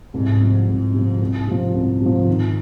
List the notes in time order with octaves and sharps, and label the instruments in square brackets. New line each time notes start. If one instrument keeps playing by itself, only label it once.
[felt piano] C2 [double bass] G#2
[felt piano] C3 F3
[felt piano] C2 [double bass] G#2
[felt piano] C3 F3
C2
C3 F3
[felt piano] C2 [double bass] G#2
[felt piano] C3 F3
D#3